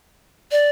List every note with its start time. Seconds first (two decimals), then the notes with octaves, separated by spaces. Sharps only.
0.52 D5